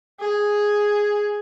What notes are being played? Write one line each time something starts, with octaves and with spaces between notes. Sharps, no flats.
G#4